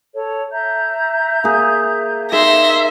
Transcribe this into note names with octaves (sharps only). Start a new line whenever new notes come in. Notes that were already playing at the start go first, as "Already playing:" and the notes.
A4 C#5
E5 A#5 G6
A#3 G#4
D#4 G#4 A#4 E5 C6 A#6